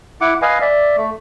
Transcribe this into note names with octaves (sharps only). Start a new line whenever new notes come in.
E4 F#5 D6
B4 D#5 F5 G#5
D5 E5
A3